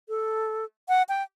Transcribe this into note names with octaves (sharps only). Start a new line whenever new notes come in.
A4
F#5
G5